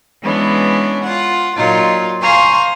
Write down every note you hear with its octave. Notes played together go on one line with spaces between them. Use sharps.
E3 G#3 B3 C#4 D4
F4 F#5
A#2 F#3 D#4 F4
C5 F5 G#5 A#5 C6 C#6